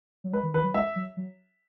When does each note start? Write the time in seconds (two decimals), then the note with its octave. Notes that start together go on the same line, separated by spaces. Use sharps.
0.24 F#3
0.33 G#3 B4
0.43 D#3
0.54 D#3 B4
0.64 F#3
0.74 G#3 E5
0.96 F#3
1.17 F#3